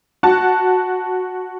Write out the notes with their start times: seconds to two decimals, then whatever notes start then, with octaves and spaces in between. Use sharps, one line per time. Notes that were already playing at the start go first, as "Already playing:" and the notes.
0.23 F#4 A5